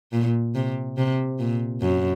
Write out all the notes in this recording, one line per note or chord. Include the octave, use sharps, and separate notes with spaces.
A#2
C3
C3
A#2
F#2